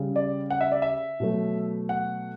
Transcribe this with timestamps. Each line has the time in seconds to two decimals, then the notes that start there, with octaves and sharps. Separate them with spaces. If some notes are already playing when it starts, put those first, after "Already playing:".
Already playing: C#3 G3
0.16 D5
0.50 F#5
0.61 E5
0.72 D5
0.82 E5
1.20 B2 F#3 A3
1.89 F#5